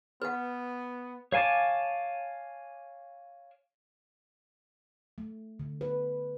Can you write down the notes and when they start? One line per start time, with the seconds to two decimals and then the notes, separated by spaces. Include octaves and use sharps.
0.22 B3 B4 F#5
1.32 C#5 F5 G#5 A5 D6
5.18 A3
5.59 D3
5.81 B4